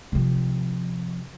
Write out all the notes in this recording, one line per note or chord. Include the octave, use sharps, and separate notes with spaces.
C3 F3